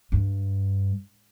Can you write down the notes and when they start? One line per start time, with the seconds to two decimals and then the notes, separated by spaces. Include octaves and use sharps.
0.12 G2